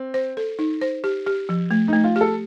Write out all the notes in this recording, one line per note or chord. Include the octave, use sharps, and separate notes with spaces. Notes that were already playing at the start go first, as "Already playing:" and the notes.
Already playing: C4
C5
A4
D#4
C5
G4
G4
F3
A3
A3 D#4
F4
G4 A4